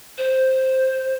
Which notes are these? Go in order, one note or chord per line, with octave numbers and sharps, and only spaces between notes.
C5